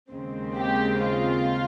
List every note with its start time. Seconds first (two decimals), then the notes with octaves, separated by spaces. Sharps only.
0.11 D#2 C#3 G#3 C4
0.57 G4
1.01 F4